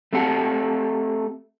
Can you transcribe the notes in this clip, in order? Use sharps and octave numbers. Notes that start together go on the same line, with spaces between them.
A3 C4 G4 F#5 A5